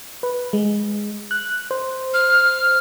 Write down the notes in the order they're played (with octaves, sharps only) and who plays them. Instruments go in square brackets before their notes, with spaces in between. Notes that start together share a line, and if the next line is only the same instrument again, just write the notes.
[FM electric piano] B4
G#3
F#6
C5
[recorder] F6